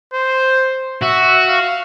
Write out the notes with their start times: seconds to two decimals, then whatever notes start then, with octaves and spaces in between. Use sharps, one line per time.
0.14 C5
1.02 F#4 E5
1.49 F5